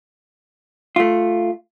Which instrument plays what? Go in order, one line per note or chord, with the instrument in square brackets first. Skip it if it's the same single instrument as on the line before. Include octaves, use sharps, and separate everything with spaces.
[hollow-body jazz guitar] A3 F4